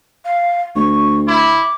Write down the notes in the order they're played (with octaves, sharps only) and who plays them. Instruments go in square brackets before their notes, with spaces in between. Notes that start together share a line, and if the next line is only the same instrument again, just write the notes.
[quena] F5
[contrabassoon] D2 [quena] C#6
[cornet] E4 [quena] D6